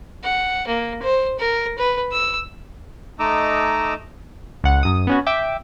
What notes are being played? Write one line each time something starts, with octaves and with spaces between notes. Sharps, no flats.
F#5
A#3
C5
A#4
B4
E6
A3 D#4 D#5 A#5 D6 E6
C#2 F#5
F#2 D#6
B3 C#4 F#4
E5 G5 D6